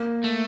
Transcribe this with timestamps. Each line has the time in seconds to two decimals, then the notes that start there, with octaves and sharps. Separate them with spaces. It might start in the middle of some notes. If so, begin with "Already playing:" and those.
Already playing: A#3
0.24 A3